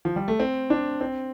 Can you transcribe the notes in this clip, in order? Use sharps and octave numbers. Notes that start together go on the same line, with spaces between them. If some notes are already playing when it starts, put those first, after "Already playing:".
F3
G3
A3
C4
D4
C4